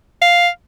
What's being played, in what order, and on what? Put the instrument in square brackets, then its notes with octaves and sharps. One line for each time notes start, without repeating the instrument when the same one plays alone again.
[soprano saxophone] F5